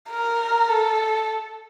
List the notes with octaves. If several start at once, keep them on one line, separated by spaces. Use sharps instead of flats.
A#4
A4